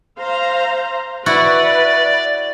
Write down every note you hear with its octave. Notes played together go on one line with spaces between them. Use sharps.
C5 F5 A#5
E4 F#4 B4 D5 F#5